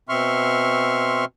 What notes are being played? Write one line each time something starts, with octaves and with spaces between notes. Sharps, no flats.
B2 C4 E5 C6 C#6 F6